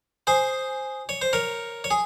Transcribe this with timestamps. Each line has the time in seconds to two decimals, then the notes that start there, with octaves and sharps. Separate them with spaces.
0.27 G#4 C5
1.09 C#5
1.22 C5
1.33 A#4 C#5
1.84 C#5
1.91 G#4